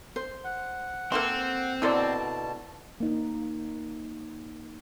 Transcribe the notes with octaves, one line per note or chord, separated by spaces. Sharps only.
C5
F#5
A#3 C4 A4 C6
B2 D3 A#3 E4 C5 D5 A5
A#3 D#4